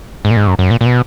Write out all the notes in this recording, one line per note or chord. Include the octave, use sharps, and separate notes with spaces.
G#2
A#2
G#2
F#2
F#2
A#2
A#2
B2